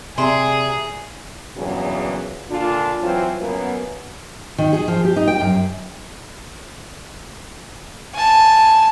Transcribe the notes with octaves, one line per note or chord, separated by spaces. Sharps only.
C3 G#4 D5 E5 A#5 C6
E2 G2 A#2 C#3 F#3
A#2 D3 D4 F4
E3 F#3 C4 F4 C5
F#2 A#3 B3
D#3
G#4
F3
G4
D#4
G5
F#2
G#5 A5